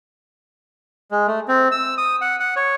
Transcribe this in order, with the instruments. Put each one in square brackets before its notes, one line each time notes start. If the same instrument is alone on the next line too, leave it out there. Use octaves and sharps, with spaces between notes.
[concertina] G#3
A3
C4
E6
D#6
F#5
F#5
C#5